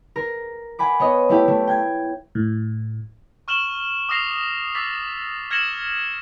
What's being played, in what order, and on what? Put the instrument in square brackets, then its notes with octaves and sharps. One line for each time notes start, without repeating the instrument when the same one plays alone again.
[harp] A#4
F#5 G#5 B5 D6
B3 C#5 D#5
A3 E4 G4
A3
G5 G#6
[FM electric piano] A2
[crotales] C#6 F6 E7 F#7 G7
D6 D#6 F6 A#6 C7 F7
D6 E6 A6 B6
F6 G#6 A#6 C#7 E7 F#7